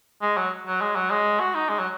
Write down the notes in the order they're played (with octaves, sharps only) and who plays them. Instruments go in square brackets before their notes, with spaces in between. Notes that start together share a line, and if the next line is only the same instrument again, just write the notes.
[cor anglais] G#3
F#3
F#3
G#3
F#3
G#3
F#4
D#4
G#3
F#3